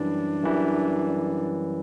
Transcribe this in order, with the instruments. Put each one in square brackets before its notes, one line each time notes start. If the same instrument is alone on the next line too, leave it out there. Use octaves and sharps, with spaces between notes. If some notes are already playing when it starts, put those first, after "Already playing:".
Already playing: [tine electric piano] F#2 E3 G3 [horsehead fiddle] D4
[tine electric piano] F#2 E3 G3